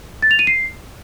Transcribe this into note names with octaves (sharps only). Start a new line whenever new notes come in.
A6
F7
D#7
C7